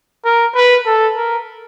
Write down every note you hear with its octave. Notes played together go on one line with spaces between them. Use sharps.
A#4
B4
A4
A#4